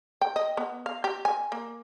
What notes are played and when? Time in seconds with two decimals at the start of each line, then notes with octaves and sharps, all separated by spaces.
0.21 G5
0.36 D#5
0.57 B3
0.86 F5
1.04 G4
1.25 G#5
1.52 A#3